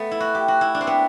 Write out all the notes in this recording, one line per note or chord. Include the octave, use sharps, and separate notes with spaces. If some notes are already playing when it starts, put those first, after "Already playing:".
Already playing: A3 B3
E4
F#4
G4
F#4
E4
D4
C4
B3